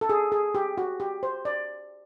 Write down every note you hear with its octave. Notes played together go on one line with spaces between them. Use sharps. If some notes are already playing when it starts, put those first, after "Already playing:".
A4
G#4
G#4
G4
F#4
G4
C5
D5